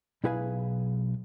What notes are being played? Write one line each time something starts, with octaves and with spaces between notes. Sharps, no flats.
B1 E4 G#4 B4 F5 G#5